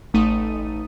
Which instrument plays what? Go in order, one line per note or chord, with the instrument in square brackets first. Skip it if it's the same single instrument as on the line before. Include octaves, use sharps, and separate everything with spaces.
[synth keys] A1 A3 D#4 D#6 D#7